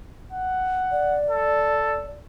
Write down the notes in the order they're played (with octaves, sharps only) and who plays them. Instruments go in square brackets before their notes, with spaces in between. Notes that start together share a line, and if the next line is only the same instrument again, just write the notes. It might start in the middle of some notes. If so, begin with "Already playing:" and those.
[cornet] F#5
[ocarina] D5
[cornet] A4